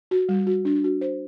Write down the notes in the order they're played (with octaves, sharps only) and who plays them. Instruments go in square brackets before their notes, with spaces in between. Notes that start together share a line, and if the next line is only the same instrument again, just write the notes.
[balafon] F#4
G3
F#4
D4
F#4
C5